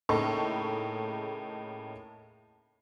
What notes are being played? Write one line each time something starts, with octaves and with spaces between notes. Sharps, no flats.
A2 C#3 A#3 D#4 A4 C#6